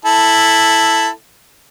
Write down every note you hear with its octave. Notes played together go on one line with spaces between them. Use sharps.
E4 A4